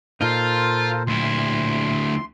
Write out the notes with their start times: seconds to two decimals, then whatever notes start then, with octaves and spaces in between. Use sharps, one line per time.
0.21 A#2 D#4 F4 A4 A#4 C5
1.07 D2 E4 C6